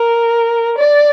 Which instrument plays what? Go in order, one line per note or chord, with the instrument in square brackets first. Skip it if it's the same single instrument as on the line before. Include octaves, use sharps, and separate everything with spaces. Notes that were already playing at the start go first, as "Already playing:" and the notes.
Already playing: [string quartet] A#4
D5